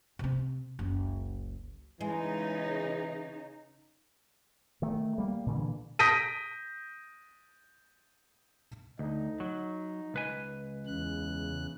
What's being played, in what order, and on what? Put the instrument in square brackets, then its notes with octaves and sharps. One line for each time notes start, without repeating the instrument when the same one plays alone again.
[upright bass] C3 C4
F#1 C#2
[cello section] C#3 D#4 [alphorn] E3 [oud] G#3
[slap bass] D#3 A3
G3 A#3
A#2 D3 E3
[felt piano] D#6 G6 A#6 B6 D7 D#7
[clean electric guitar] D2 [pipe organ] D#4
[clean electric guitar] F#3
C#2 B4 G#5
[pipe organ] E2 C#3 F#6